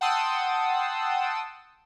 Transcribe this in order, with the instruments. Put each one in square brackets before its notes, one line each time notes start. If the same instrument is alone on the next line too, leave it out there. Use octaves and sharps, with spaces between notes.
[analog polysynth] F#5 G5 A5 C6 D#6 E6